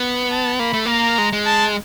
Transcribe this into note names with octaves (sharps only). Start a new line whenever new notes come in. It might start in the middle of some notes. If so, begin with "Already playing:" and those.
Already playing: B3
A5
A#3 B5
A3
A#3 A#5
G#3
G#3
A5